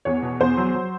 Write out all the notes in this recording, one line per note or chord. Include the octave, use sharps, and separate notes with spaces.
E2 C#5
B2
E2 C5
F#3
F#3